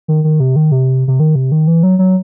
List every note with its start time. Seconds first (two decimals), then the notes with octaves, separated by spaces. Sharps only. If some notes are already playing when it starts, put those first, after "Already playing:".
0.08 D#3
0.24 D#3
0.40 C3
0.56 D#3
0.72 C3
1.08 C3
1.20 D#3
1.35 C3
1.52 D#3
1.67 E3
1.83 F#3
1.99 F#3